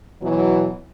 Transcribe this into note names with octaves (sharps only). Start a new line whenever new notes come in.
B2 E3 F#3